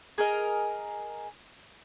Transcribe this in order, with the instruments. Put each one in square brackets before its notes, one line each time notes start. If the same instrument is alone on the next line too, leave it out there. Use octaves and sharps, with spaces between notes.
[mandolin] G#4 A#4 D#5